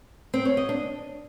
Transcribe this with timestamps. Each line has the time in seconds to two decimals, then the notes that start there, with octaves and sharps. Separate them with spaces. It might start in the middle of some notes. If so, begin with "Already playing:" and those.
0.34 C4
0.45 C#5
0.57 D#5
0.69 D4